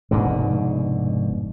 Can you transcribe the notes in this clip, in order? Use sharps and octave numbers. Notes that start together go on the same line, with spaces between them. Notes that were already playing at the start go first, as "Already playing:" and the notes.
F1 G#2 B2 D3